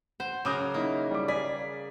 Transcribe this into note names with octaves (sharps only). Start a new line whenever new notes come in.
C5 F#5
C#3 F#3 A#4 D6 D#6 G6
A#3 D#4 E4
G3 D6
G#4 D5 B6